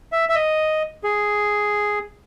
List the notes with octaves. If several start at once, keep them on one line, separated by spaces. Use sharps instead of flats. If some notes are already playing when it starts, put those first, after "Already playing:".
E5
E5
D#5
G#4